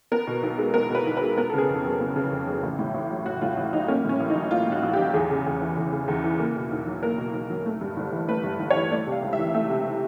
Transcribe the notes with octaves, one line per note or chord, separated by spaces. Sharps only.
B3 A#4
B2
B1
G#3
B3 A#4
B2 B4
B1
B4
G#3
B3 A#4
A4
C#3 G#4
F2
F#3
B3
C#3
F2
F#3
A1
A2
A1
F#3
A1 F#4
A2 F4
A1
F#3 D#4
A#3 C#4
A2 C#4
A1
D#4
F#3
A#3 F4
A2
F#4
A1
G4
F#3
E2 G#4
C#3
E2
E3
E2
C#3
E2
E3
A#3
B2
B1
F#3
A#3 A#4
B2
B1
F#3
A3
G2
G1
E3
A3 B4
G2
G1
C#5
E3
A3 D5
C3
F5
C#2
E5
E3
A3 E5
C3